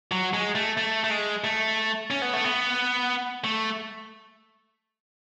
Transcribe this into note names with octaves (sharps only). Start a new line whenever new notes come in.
F#3
G#3
A3
A3
A3
G#3
A3
C#4
B3
A3
B3
A3